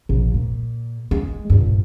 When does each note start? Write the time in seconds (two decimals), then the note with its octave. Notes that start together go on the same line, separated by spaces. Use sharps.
0.09 A#1
0.34 A#2
1.11 G#3
1.50 G2 A#2